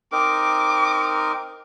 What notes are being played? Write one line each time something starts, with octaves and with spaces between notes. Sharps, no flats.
C4 D#4 A#4 D6